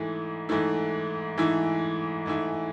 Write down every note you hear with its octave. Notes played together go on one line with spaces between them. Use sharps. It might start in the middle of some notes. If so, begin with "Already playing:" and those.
Already playing: G#2 E3 A3 E4
G#2 E3 A3 E4
G#2 E3 A3 E4
G#2 E3 A3 E4